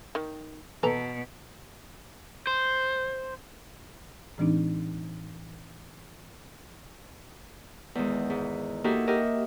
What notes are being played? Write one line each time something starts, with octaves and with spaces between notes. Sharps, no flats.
D#3
B2 E3 A4 A#5
C5
A2 E3 G#3 C4 D4 D#4
E2 D#3 G#3
G#2
A#3 D#4 E4 F#4 G4 A4
F#4 G4 A#4 D#5 E5